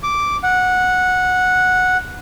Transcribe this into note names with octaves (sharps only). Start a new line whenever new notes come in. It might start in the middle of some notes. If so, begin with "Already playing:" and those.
D6
F#5